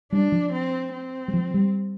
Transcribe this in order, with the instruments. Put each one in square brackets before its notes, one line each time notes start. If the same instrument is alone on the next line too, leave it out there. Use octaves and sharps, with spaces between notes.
[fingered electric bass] G3 [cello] D4
[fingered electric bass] F3
[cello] C4
C4
[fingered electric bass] G3
F3
G3